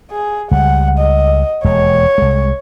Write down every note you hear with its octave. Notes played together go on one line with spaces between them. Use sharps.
G#4
C#2 G3 F#5
D#5
E1 D#2 G#3 C#5
C2 G#3